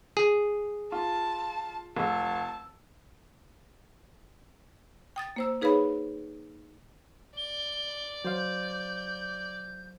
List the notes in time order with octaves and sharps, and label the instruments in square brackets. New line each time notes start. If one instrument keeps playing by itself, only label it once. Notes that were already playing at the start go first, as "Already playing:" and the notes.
[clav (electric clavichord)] G#4
[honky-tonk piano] F4 [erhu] A5
[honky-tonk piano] F1 E6 [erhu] A5
[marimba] G5 D#6 A6
A#3 C5 E6
D#4 G#4 B4 C#5 F5 B5
[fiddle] D5 [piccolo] G7
[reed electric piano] F#3 C5 F5 [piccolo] G6